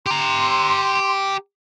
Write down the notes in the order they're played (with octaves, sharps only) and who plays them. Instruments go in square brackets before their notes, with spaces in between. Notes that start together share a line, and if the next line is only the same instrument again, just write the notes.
[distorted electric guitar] G4 A#5 [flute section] C6